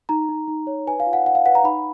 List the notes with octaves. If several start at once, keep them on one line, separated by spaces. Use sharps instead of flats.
D#4 A#5
D#4
D#4
C#5
B4 G#5
F5
F4
F#5
F4 F#5
F5
B4 F#5
A#5
D#4 B5